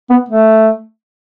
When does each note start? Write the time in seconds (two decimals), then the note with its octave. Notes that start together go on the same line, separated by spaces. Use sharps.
0.10 B3
0.29 A3